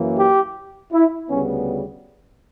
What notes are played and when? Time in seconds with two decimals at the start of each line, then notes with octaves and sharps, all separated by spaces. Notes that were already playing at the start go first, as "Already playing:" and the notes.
Already playing: F#2 E3 A#3
0.18 G4
0.93 E4
1.30 D2 C#3 G3 B3 C#4